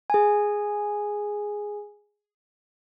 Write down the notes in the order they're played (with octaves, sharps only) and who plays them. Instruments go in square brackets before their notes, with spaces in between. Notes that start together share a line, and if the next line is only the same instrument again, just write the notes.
[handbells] G#4 G#5